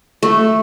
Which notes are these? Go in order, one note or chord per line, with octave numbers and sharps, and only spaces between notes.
A3